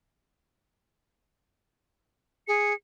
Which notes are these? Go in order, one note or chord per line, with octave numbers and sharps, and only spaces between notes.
G#4 C#7